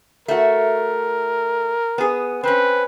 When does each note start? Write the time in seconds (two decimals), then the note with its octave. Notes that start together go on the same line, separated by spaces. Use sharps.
0.28 A3 F#4 A#4
1.98 B3 G#4
2.43 C4 C#4 B4